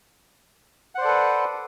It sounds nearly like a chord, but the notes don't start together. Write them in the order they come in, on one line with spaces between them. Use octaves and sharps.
F#5 C5 D5 A4 B4